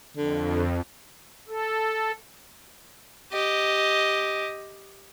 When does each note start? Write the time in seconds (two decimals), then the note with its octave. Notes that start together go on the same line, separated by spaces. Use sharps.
0.17 F2 D3
1.48 A4
3.32 G4 D#5